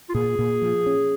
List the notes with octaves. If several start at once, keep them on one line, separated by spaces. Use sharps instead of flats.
F4
A#2 G#4
A#2
F3
C#4